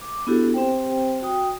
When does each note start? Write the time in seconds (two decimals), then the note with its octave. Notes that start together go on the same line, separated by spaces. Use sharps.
0.01 D6
0.27 B3 D4 E4 F#4 G4 A4
0.54 C4 G4 C5 G5
1.22 F#4 G5 D#6